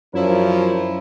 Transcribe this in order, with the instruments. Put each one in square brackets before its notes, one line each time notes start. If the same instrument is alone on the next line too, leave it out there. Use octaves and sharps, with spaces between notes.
[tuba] F#2 [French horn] F3 [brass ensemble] D4 A#4 C#5 [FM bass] E4